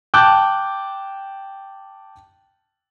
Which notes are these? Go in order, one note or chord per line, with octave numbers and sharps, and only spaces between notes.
G5 A5 D6 F#6 G6